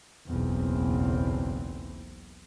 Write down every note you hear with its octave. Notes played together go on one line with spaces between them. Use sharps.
F#1 B1 E2 C4